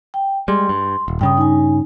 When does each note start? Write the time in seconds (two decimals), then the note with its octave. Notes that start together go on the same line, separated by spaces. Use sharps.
0.14 G5
0.48 G3 G#3 C6
0.69 G2
1.08 D#1
1.21 G2 C#3 G5 D#6
1.37 D#4 G#5